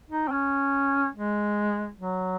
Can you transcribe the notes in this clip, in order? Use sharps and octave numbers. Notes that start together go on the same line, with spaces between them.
D#4
C4
C#4
G#3
F#3